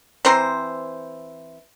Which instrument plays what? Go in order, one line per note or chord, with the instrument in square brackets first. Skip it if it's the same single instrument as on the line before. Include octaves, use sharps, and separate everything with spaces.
[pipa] E3 C4 C5 A#5